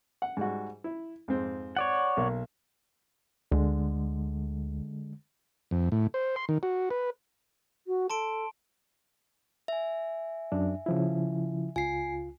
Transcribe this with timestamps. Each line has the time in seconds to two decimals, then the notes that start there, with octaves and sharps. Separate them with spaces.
0.22 F#5
0.37 G#2 G3 F#4
0.84 E4
1.28 F2 G#2 C4
1.77 C#5 D5 F#5
2.17 B1 A#3
3.51 D2 D3 G#3
5.71 F2
5.92 A2
6.14 C5
6.36 C6
6.49 D#3
6.63 F#4
6.91 B4
7.87 F#4
8.10 A4 A5 C6 D7
9.68 E5 G#5
10.52 F#2 D4
10.86 C#3 F3 E4
11.76 C#2 F4 G#5 C7